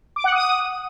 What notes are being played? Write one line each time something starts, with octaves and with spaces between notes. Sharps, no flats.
D6
F#5
D#6